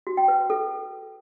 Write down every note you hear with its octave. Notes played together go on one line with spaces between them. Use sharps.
F#4
G5
B4
B4
A4